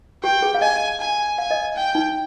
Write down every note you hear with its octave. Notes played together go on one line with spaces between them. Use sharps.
G4 G5
G#4
F5
D#5 G#5
G#5
F5 G#5
D#5
G5
D#4